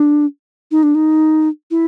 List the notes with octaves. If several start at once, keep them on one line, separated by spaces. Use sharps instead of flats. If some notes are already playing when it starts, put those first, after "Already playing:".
Already playing: D4
D#4
D4
D#4
E4